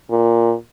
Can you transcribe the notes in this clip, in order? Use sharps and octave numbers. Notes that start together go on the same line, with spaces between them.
A#2